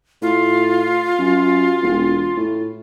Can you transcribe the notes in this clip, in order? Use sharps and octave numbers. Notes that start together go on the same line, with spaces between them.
A2 F4
F#2
E1
A2